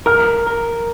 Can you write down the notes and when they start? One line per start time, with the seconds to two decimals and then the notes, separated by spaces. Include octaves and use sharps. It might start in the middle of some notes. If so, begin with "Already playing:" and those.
0.06 A#4 F6
0.47 A#4